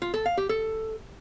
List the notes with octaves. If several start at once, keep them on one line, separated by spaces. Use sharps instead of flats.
F4
A4
F5
G4
A4